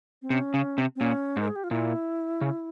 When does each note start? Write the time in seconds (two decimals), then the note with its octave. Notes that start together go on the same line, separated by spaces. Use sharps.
0.22 C4
0.30 C3 C#4
0.54 C#3
0.78 C3
0.96 C4
1.00 A#2 C#4
1.37 G#2 A#4
1.48 G#4
1.56 G4
1.64 F4
1.71 A#2 E4
2.41 C#3